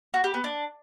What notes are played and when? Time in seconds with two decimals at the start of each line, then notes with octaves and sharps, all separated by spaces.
0.14 F#4
0.24 G4
0.34 B3
0.44 D4